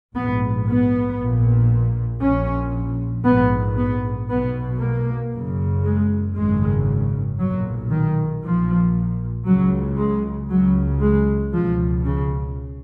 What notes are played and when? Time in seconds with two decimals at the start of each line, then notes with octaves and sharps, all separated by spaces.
0.15 A#1 G#2 B3
0.67 B3
1.18 A#1 A#2
2.21 A#1 A#2 C#4
3.25 A#1 G#2 B3
3.77 B3
4.29 B1 B2 B3
4.81 A#3
5.32 F#1 F#2 C#3
5.84 G#3
6.36 G#1 F#2 C#3 G#3
7.39 B1 A#2 F#3
7.91 D#3
8.43 A#1 A#2 F3
9.46 C#2 C#3 F#3
9.98 G#3
10.49 C#2 C#3 F#3
11.01 G#3
11.53 C#2 B2 F3
12.05 C#3